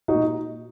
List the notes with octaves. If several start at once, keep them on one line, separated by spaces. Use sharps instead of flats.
D#4 F#4
A#2